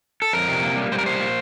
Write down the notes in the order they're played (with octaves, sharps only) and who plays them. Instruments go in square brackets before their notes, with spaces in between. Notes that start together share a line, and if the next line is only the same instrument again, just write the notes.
[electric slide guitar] A4
F2 A#4
C3
A#3
G3
G3 C5
A#4
A#3 C5
A#3